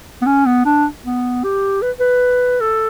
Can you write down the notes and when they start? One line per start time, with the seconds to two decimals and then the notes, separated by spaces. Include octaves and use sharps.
0.22 B3
0.26 C#4
0.46 B3
0.65 D4
1.05 B3
1.44 G4
1.82 B4
2.00 B4
2.61 A4